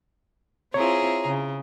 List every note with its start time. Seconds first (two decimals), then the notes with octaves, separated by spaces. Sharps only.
0.74 C4 E4 F4 G#4 C#5 A#5
1.26 C#3